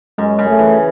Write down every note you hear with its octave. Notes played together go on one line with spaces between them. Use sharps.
F#2 G#3
C#3
A3
E3